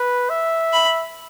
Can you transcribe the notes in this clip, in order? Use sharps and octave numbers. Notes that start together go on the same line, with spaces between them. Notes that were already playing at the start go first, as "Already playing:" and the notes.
Already playing: B4
E5
B5